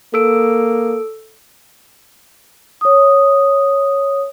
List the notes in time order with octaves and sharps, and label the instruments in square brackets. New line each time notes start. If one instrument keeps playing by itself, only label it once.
[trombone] A#3 [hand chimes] A4 E6 D7
[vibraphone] C#5 D#6